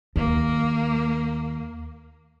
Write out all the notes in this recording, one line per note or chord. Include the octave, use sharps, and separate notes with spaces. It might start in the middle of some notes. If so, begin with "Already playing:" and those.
D#2 A#3